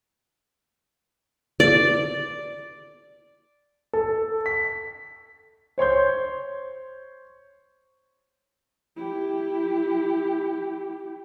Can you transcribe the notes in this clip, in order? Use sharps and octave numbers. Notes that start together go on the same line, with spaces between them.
D5
A4
B6
C5 C#5 C6 G6
E4 G4